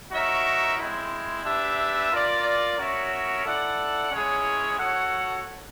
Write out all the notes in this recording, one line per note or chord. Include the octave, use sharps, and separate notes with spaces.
D#4 F#4 A#4 C#5 E5
G#3 C4 E4
D4 G4 B4 E5
F4 A#4 D5
C#4 F#4 A#4 C#5 E5
E4 A4 D5 F#5
G#3 C#4 E4 G#4 C#5
F#4 A4 C#5 F#5